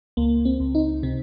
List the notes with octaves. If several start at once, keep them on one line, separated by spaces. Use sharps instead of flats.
C#2 A#3
C4
C#2
D#4
C3 C4